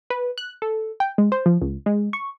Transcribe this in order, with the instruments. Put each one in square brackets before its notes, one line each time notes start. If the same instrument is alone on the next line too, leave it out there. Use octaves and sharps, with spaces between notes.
[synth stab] B4
F#6
A4
G5
G#3
C5
F3
C#2
G#3
C#6